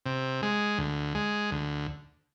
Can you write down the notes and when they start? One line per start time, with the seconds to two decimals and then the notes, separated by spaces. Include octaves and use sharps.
0.06 C3
0.43 G#3
0.78 D2
1.15 G#3
1.51 D2